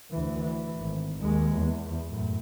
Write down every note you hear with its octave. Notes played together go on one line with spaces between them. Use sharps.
D2 E3
E3
G#1
D#2 G#3
E2
F#2 A2